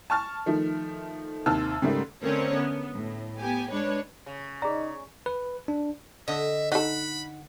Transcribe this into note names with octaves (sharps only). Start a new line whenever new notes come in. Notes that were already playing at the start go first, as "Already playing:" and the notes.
A5 C#6 F6 A6
D#3 F3 A3
D#2 C3 D#3 A5 E6 F6
G#2 C#3 G3 A3 A#3
D3 A3 C4 C#4 A#4 C#5
B3
A2
B3 G4 G#5
G#3 D4 B4 C#5
C#3
D#4 G#4 D5 A#5
B4
D4
D3 D#5 E5
D#4 A4 F#5 B5